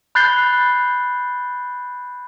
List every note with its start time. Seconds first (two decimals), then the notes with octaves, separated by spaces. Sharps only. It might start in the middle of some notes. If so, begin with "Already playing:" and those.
0.15 B5 F#6 G6 A6 C7 G7